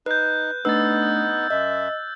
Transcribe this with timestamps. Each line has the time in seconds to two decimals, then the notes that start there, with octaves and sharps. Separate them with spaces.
0.06 D#4 B4 F#6 G6
0.65 A3 B3 D4 D#4 B4 E6 A6
1.50 F#2 D#5 E5